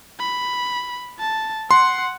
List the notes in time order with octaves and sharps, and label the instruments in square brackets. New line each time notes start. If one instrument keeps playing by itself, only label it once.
[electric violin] B5
A5
[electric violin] F#5 [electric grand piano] C6